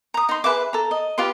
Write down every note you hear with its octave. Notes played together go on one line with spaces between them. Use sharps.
A#5 D#6
D#4 C6
G#4 B4 E5 D6
A4 A#5
D#5
F4 G4 B4 C6